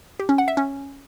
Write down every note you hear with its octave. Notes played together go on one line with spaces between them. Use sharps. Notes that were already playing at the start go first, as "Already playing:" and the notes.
G4
C#4
F#5
E5
C#4